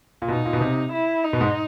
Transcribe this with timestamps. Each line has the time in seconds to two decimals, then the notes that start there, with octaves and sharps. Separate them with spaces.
0.22 A#2
0.28 B2 D#4
0.45 A#2
0.53 B2
0.61 C3
0.93 E4
1.24 D#4
1.33 B2
1.41 G#2